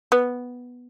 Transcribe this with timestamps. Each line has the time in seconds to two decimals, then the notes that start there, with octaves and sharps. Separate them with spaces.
0.12 B3